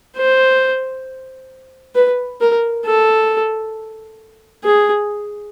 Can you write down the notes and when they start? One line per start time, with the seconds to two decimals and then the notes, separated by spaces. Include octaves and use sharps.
0.16 C5
1.95 B4
2.41 A#4
2.85 A4
4.64 G#4